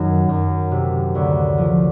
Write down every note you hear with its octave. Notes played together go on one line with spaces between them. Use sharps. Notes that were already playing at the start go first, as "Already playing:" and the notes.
Already playing: F#2 D#3
F#2
C3
D2
F3